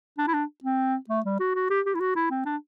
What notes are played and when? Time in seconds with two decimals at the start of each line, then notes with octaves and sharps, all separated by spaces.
0.18 D4
0.27 E4
0.34 D4
0.64 C4
1.10 A3
1.25 G3
1.40 F#4
1.55 F#4
1.70 G4
1.86 G4
1.95 E4
2.00 F#4
2.16 E4
2.31 C4
2.46 D4